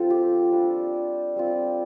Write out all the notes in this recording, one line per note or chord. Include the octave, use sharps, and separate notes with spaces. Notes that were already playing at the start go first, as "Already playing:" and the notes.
Already playing: F3 C4 F4 A4
G4
G3 D4 F4
G3 C4 F4